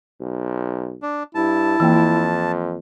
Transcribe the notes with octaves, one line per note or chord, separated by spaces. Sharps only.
B1
D4
G2 E4 A5
F2 E3 A#3 G5